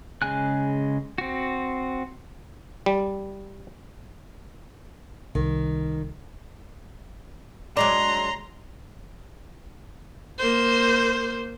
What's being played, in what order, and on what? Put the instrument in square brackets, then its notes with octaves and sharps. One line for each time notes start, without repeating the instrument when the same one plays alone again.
[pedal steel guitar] C#3 G#3 G#5 F#6
C4 F#4
[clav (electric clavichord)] G3
[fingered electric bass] C2 [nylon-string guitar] D#3
[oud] F#3 G#3 D4 [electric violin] A#5 C6
[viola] A#3 C5